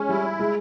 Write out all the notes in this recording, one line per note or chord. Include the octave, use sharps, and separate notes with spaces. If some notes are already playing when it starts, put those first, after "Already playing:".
Already playing: G#3 C#4
G3 E4
G#3